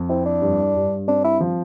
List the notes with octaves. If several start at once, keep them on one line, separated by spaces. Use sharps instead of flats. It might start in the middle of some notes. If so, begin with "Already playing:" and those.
Already playing: F2
C4 E4
D4
G2
G2
C4 D4
E4
F3